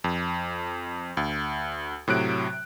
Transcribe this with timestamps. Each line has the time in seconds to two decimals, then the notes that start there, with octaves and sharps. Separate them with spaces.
0.04 F2
1.17 D2
2.08 A2 C3 F#3 F#6 D7